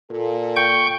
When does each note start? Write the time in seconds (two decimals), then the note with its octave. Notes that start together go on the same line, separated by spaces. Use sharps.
0.10 A#2 A4
0.56 G5 C#6 G6